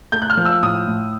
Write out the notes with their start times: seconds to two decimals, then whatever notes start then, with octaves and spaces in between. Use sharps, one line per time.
0.12 A3 G6
0.22 F#6
0.30 F6
0.37 F3
0.45 E6
0.62 A2 D#6
0.87 A2